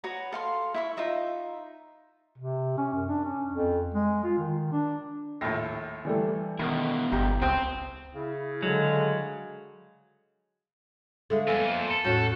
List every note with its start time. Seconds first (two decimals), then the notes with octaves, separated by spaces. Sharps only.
0.04 F#4 B4 C#5 A#5
0.32 A4 F5 C6
0.74 E4 E5 C#6
0.97 D#4 F4 E5 A#5
2.38 C3
2.78 C#4
2.94 F#2
3.08 D4
3.25 C#4
3.53 F2
3.94 G#3
4.24 F4
4.38 D#3
4.72 D4
5.41 A#1 D#2 A2 A#6
6.05 E3 G3 A3
6.59 B2 D#3 E4 A#4
7.12 G1 G4 A#5
7.42 C#2 C4 C5 G5 D#6
8.14 C#3 E4
8.63 D3 F#3 G#3
11.30 D3 G#3 A3 A4 E5 F5
11.47 F2 A#3 B3 F5 G#5 E6
11.91 A4
12.04 E2 A2 C#4 F#4 G6